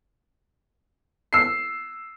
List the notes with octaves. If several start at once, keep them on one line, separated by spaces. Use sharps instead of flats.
E6 C7